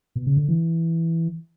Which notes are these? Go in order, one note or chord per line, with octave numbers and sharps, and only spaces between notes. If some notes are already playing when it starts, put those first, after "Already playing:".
B2
C#3
D3
E3